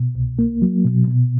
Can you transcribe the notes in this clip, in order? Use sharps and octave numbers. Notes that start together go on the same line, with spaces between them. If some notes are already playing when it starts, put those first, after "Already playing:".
Already playing: B2
C2
A#3
F#3
B2
B2